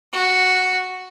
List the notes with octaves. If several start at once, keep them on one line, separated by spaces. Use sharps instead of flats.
F#4